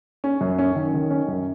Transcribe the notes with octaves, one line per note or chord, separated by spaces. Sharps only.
C#4
F#2
C#4
D#3
D#3
C#4
F#2